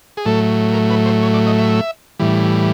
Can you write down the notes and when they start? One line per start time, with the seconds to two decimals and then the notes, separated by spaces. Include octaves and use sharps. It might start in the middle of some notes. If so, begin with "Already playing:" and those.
0.17 G#4
0.25 A2 F#3 A3 A4
0.73 A#4
0.90 B4
1.06 C5
1.23 C#5
1.34 D5
1.47 D#5
1.58 E5
2.19 A2 E3 G3